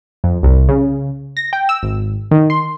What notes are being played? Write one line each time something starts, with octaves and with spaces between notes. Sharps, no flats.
F2
C2
C#3
A#6
G5
E6
G#1
D#3
C6